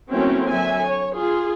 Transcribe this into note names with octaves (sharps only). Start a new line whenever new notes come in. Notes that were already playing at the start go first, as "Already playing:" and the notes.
F#3 A3 A#3 C4 C#4 E4
D3 F#3 E5 G#5
C#5
F4 G#4